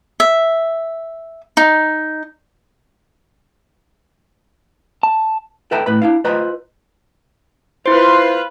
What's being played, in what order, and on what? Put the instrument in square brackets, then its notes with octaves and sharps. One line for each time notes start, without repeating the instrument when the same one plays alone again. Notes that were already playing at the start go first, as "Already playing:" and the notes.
[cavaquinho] E5
D#4
[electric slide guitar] A5
[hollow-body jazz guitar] A4 B4 E5 G5 A5 A#5
A2 B4 B5
D4 E4 F5
F4 B4 C5 D#5 G#5 A#5
[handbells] E4 C5 [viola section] F4 B4 [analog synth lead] C6